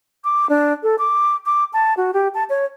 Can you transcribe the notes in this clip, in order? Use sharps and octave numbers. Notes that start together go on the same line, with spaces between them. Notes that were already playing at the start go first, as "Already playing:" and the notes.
D6
D4
A4
D6
D6
A5
F#4
G4
A5
C#5